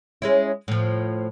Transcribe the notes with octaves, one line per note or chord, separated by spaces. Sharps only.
G#3 C#4 E4
A2 F3